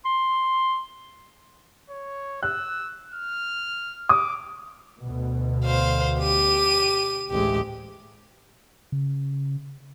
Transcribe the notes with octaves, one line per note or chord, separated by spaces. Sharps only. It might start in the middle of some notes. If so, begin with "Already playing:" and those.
C6
C#5
E6 F#6
F6
D6 D#6
D2 B2
C5 F5
G4 D#7
A1 D2 G#3 G4
C#3